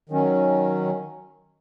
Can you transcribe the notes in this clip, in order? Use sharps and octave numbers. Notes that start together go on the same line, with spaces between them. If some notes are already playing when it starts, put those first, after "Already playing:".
D#3 F#3 C#4